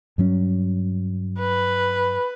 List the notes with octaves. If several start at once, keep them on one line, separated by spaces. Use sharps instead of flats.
G2 F#3 C#4
B4